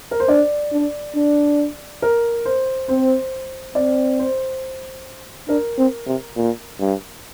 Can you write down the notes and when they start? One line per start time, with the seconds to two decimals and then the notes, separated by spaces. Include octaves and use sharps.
0.11 A#4
0.20 C5
0.28 D4 D5
0.72 D4
1.16 D4
2.02 A#4
2.45 C5
2.89 C4 C5
3.75 C4 D5
4.19 C5
5.48 D4 A#4
5.78 C4
6.06 C3
6.36 A#2
6.80 G2